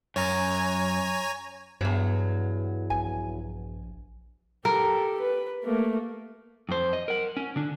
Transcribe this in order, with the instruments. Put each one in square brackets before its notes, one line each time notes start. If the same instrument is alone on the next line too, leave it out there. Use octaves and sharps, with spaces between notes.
[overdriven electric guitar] F#2 [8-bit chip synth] C#5 G#5 A#5
[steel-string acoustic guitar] E2 F#3 [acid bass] G2
[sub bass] A#1 [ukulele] G#5
[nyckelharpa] G4 A4 [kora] A#4
[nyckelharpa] B4
A3 A#3
[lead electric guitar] F2 C5
D#5
A#4 F#5
C#4
D3 D4